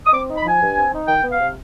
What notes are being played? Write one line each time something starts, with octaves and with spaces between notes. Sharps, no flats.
D#6
C4 D6
D#4
B5
F3 G#5
G2
C4
D#4
D#3 G5
B3
F5
C3